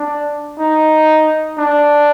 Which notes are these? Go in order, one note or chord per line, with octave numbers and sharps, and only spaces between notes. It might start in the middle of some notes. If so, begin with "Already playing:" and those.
Already playing: D4
D#4
D4